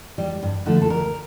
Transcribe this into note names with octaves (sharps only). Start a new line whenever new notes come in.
G3
G2
D3 F3 A3
A4
D2 A#4